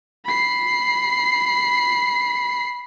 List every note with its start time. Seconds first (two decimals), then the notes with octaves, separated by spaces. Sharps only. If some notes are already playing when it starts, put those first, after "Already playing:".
0.25 B5 C7